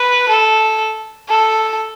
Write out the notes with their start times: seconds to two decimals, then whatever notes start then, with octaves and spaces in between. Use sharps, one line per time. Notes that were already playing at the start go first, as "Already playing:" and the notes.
Already playing: B4
0.29 A4
1.29 A4